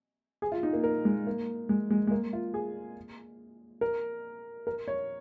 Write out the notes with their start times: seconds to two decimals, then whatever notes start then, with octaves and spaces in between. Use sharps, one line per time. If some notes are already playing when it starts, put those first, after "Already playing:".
0.42 G#4
0.52 F4
0.63 D#4
0.73 A#3
0.84 A#4
1.05 G#3
1.27 A#3
1.69 G#3
1.90 G#3
2.07 G#3
2.11 A#3
2.33 F4
2.54 G#4
3.81 A#4
4.67 A#4
4.88 C#5